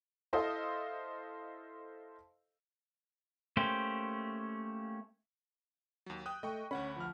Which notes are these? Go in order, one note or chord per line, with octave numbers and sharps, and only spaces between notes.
E4 A4 C5 D#5 F5
A3 A#3 C#4 G4 C5
D#2 F#3
G5 D#6 F#6
A3 D#5 G5 C#6
D2 C#4 F#5 B5
F3 F6